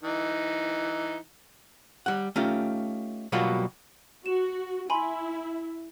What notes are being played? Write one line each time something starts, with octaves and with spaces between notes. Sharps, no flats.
E3 D#4
G3 F#5
A3 C#4 D#4 F4 G4
B2 F#3 G3 A#3 F4 F#4
F#4 E7
E4 G#5 B5 C6